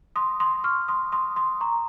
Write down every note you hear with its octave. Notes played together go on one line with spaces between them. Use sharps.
C6 D#6
C6 D#6
C#6 F6
C6 D#6
C6 D#6
C6 D#6
A#5 C#6